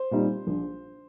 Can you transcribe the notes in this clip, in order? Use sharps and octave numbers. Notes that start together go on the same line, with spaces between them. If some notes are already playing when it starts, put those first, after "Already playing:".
Already playing: C5
A#2 G3 C4 D#4
A#1